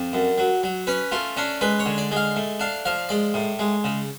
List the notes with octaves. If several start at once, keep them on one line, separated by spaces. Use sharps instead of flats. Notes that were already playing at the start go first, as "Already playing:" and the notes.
Already playing: F2
F#2
F#3
F#3
C#4 B4
A3 F4
C#4 D4
G#3 B4
C#5
D3
D5
G#3 F5
A3
D4 F5
F3 F5
G#3 D5
A2
G#3
C#3